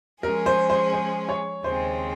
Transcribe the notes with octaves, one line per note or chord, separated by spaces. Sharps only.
F3 G#3 C#4 G#4 A#4
C5
C5
C5
C#5
D#2 C#3 G#3 C4 C5